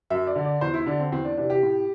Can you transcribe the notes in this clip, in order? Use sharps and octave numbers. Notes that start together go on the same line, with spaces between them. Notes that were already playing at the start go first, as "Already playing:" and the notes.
F#2 E5
D5
D3
D5
E2 C5
E4
D3 D4
C4
E2 C4
D4
C3 E3 D4
G4
A2